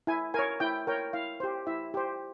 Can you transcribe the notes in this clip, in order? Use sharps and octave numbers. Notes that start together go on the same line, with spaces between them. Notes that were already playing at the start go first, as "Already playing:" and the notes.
E4 G#5
A#4 C#5 G#5
E4 G5
A#4 C#5 G5
E4 F5
G4 C5
E4 E5
G4 C5